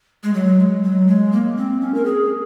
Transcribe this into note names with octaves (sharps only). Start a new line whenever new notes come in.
G#3
F#3
G#3
F#3
G#3
A#3
C4
C#4
A#4
G#4